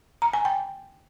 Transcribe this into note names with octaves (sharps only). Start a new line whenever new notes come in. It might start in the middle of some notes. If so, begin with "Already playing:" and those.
A#5
G#5
G5